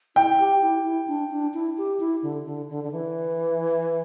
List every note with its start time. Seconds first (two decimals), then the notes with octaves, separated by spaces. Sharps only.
0.16 E4 G5
0.39 G4
0.62 E4
0.85 E4
1.08 D4
1.31 D4
1.54 E4
1.77 G4
2.00 E4
2.22 D3
2.46 D3
2.69 D3
2.84 D3
2.92 E3